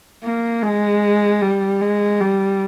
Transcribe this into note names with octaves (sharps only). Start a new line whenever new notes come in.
A#3
G#3
G3
G#3
G3